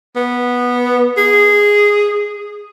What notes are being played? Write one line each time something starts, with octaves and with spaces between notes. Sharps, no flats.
B3
G#4